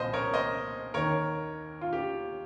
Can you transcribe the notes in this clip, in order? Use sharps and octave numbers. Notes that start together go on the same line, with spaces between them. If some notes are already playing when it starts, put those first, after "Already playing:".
Already playing: C2 A#2 F3 C5 D#5
A#4 C#5
C5 D#5
D#2 D#3 A#4 C#5
F4
G4